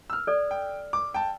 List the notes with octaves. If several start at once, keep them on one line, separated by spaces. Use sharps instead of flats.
E6 F6
A4 D5
G5
D6
G5 A5